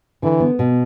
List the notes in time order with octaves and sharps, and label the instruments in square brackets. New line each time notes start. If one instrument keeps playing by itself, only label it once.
[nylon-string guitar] D3 [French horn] E3
[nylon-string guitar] B3
B2